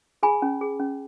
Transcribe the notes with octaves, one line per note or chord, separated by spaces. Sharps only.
G#4 G#5 B5
C#4
G#4
C#4